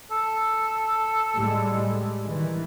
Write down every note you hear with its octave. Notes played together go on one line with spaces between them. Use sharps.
A4
A2 G3 G#3
D#3 E3